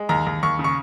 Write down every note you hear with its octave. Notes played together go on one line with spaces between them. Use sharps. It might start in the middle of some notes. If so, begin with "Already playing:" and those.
Already playing: G#3
D#2 A#5
D#2
D#2 C#6
C#3
C#6